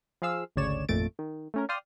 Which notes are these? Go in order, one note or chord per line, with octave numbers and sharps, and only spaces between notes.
F3 G#4 F5 E6
G#1 D2 C#3 C#5 D5 E7
G#1 F2 A#2 A3 A6 D7
D#3
A3 C#4 A#4
D5 F5 G5 C6 D#6 F6